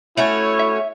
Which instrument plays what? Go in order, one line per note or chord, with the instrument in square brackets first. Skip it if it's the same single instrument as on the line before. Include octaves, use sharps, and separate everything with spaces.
[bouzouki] A3 C#4 F#4 [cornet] E4 [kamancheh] C#5
[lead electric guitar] E5